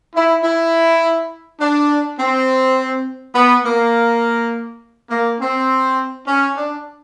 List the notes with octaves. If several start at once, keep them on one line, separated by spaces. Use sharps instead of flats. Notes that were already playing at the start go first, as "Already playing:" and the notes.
E4
E4
D4
C4
B3
A#3
A#3
C4
C#4
D4